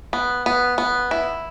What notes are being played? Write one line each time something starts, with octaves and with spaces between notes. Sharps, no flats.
B3
B3
B3
E4